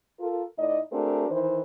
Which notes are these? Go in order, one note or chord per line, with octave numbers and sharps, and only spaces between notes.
F4 A4 A#4
A2 D#4 E4 D5 D#5
A3 C4 D4 F#4 G#4 A#4
D#3 E3 C5